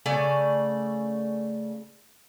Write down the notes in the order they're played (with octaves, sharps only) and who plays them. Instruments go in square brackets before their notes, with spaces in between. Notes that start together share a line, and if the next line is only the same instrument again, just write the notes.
[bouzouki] C#3 A3 D5 G#5